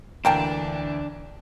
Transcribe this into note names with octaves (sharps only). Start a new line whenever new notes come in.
D2 E3 A#3 D4 G5 A5